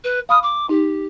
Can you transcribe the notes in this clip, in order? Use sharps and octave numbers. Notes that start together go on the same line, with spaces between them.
B4
F5 B5 D#6 F6
D6
D#4 G4